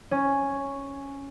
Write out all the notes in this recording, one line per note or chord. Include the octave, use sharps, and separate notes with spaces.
C#4